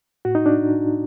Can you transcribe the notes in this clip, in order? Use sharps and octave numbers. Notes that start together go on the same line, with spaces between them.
A2 F#4
D#4
D4